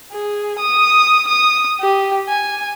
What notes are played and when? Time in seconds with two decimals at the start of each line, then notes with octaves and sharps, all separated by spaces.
0.12 G#4
0.59 D#6
1.28 D#6
1.80 G4
2.29 G#5